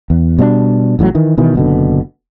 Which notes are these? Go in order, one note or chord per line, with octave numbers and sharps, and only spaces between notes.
E2
B2 G3 A#3 D4
A1 A2 C3 F#3
D#3 E3
B2 D#3 E3
F#1 B2 D3